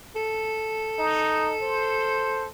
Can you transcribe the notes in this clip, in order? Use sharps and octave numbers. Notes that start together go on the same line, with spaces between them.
A4
D#4
C5